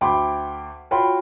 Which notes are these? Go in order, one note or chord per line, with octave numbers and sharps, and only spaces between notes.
D2 G5 B5 C6 D6
F4 F#4 C#5 G5 B5 C6